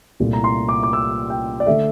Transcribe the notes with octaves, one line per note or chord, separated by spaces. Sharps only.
C2 A#2 A3 E4
A#5
C6
D6
D6
E6
G5
D5
D3 A3 E5